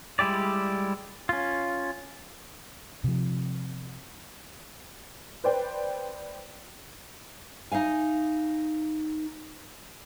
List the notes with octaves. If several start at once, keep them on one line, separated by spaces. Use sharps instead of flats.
G3 G#3 E4 G4 D5
C#4 F4
C3 F3
B4 C5 D5 G5
D#4 E5 F5 G#5